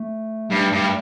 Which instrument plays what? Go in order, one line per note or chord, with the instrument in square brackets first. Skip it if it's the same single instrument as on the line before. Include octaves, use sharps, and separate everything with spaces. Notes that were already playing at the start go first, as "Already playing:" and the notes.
Already playing: [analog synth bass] A3
[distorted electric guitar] G2
G2